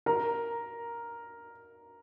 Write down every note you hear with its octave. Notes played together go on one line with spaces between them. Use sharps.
A#4 A#5